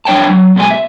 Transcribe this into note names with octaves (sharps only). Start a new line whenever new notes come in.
F3 D4 C#5 G5 A5
F#3
B2 G3 G#3 G#5
E5